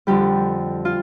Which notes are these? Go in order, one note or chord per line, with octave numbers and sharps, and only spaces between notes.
F2 D3 G3 G4
F4